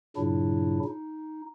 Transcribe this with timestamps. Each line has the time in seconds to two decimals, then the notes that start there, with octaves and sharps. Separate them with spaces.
0.17 G2 A#2 C#3 F#3 D4 E4
0.84 D#4